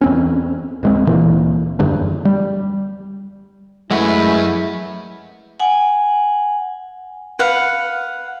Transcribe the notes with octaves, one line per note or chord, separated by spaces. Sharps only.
E2 C4 C#4
D1 G#3 C4
D2 A#2 E3 A#3
F#1 E2 G2 D3
G3
F#2 G#3 A3 E4 B4 F#5
F#5 G#5
B4 F5 F#5